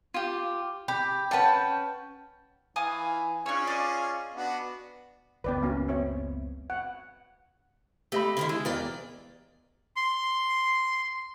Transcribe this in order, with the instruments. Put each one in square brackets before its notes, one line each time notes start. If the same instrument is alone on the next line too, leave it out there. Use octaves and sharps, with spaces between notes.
[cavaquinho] F4 G4
[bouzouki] G4 [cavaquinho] B5
[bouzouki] C#4 G5 [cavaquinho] B4 F#5 A5
[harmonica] E3 [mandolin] F5 G#5 D#6
[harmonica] C#4 F4 G#4 [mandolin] D4 C#5
[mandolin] D5 D#5
[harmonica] B3 D4 F#4
[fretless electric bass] F#1 C#2 B3 [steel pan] B4 D5 G5
[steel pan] A#3 C#4 F#4
C4 C#5 E5
F#5
[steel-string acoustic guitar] A3 [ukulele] G4 D#5 B5
[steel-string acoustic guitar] D3 D#3 E4
[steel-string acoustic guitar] G#3 [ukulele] E4
[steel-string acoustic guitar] E2 D5 G5 [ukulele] A#4
[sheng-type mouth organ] C6